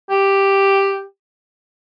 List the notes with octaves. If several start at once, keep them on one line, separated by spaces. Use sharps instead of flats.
G4